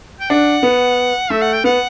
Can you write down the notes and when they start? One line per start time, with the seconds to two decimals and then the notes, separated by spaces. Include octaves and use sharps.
0.20 G5
0.30 D4 F#5
0.63 B3
1.30 A3 E5
1.41 F#5
1.53 G5
1.64 B3 F#5